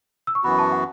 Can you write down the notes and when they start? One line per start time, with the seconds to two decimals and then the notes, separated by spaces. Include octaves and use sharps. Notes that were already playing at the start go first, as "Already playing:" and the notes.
0.27 E6
0.35 C#6
0.43 F#2 E3 B3 F#4 B5
0.59 A5
0.72 F#5